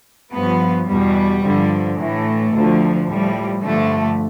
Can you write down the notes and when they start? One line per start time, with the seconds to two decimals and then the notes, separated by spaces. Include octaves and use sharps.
0.32 G2 F3 B3
0.86 E2 B2 G3
1.41 G2 D3 F3
1.97 A2 E3 A3
2.52 D2 D3 F3
3.06 A2 F3 G3
3.62 G2 D3 F3 A3